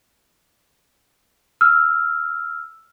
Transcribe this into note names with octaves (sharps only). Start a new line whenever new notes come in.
E6 F6